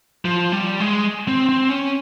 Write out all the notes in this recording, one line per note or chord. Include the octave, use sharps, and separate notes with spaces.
F3
G3
G#3
C4
C4
C#4